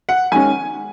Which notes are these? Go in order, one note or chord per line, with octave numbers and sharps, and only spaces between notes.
F#5
D#3 G#3 C#4 G#5